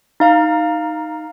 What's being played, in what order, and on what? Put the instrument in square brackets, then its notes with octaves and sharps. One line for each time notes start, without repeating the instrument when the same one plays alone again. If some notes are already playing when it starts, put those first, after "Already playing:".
[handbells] D#4 F5 A#5